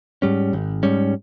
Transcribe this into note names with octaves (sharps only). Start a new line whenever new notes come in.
G#2 G3 C#4
G#1
G#2 G3 C#4